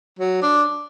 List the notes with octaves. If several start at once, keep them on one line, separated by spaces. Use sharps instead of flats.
F#3
D4